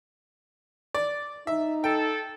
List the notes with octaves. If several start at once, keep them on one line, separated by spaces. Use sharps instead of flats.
D5
D#4 E5
A4 G5